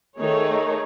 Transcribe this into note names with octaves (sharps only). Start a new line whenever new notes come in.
D#3 A3 D#4 G#4 C#5